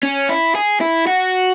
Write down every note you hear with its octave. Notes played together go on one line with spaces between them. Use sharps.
C#4
E4
G#4
E4
F#4